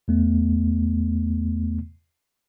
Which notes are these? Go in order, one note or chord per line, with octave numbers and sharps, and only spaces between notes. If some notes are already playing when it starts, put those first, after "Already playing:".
E2 A3 B3